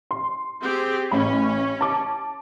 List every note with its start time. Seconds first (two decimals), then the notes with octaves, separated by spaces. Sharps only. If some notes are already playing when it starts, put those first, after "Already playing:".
0.11 C6
0.62 C4 G4 G#4
1.11 A1 C#4 B5
1.81 A5 D6